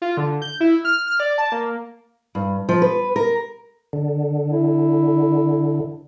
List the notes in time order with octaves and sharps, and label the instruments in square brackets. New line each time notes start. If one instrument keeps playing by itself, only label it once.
[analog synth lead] F4
D3
G6
E4
F6
F6
D5
A5
A#3
[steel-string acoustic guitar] G2
F3
B4
A#4
[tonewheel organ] D3
[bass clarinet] E4